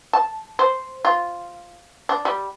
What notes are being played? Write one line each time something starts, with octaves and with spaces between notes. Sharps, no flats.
A5
C5
F4
D4
G3